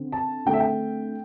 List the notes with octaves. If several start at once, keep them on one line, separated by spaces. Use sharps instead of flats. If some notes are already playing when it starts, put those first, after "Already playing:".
Already playing: D3 C4
A5
D3 A3 C4 G5
E5
G5